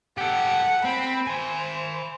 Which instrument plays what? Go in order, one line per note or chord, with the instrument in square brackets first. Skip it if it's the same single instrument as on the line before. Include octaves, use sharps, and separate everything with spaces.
[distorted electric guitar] G4 A4 [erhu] F#5
[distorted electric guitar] C4 [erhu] B5
[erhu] C5 [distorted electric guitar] G#5 B5